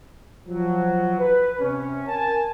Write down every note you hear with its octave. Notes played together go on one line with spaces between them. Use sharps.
F3 F#3
B4
C3 C#4
A#4 G#5 A5